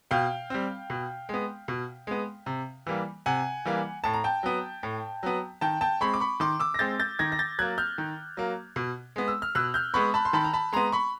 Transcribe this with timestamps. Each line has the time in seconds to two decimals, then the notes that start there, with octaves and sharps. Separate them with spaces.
0.11 B2 F5 G5
0.50 G3 C4
0.90 B2
1.29 G#3 B3
1.68 B2
2.07 G#3 B3
2.46 C3
2.87 E3 G3 A#3
3.26 C3 F#5 G#5
3.65 E3 G3 A#3
4.04 A2 A5
4.14 A#5
4.24 G5 A5
4.43 F#3 B3
4.83 A2
5.23 F#3 B3
5.61 D#3 G5 A5
5.81 G5 A5
6.01 G#3 C4 B5 C#6
6.14 D6
6.20 B5 C#6
6.40 D#3 C6 D6
6.60 D6 E6
6.74 A#6
6.79 G#3 C4 G6 A6
7.00 G6 A6
7.19 D#3 G#6 A#6
7.32 A#6
7.39 G6 A6
7.59 F#3 A#3 F#6 G#6
7.78 F6 G6
7.98 D#3
8.37 F#3 A#3
8.76 B2
9.16 G#3 B3
9.28 E6
9.42 F6
9.55 B2 E6 F#6
9.74 F6 G6
9.94 G#3 B3 B5 C#6
10.14 A5 B5
10.25 C6
10.33 D#3 A5 B5
10.44 A#5
10.53 A5 B5
10.73 G#3 B3 A#5 C6
10.92 B5 C#6